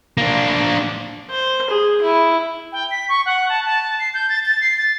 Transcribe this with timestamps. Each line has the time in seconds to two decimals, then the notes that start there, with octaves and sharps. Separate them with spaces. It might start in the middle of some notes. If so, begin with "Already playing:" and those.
0.18 A#3 D4
1.30 C5
1.70 G#4
2.02 E4
2.72 G5
2.91 B6
3.09 C#6
3.26 F#5
3.49 A5
3.66 A5
4.00 C7
4.14 G6
4.29 A6
4.45 A6
4.61 C7
4.78 A6